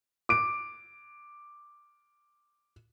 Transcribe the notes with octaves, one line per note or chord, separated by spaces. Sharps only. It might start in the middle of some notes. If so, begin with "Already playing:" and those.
D6 D7